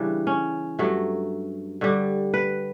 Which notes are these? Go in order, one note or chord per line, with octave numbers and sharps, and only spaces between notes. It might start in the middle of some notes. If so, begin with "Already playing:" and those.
Already playing: C#3 E3 G3 D4
C#4
G2 F#3 A3
G2 D3 G3
B4